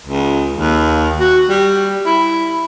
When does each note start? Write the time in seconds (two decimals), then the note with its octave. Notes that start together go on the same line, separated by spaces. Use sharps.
0.07 C#2
0.57 D#2
1.20 F#4
1.50 G3
2.06 E4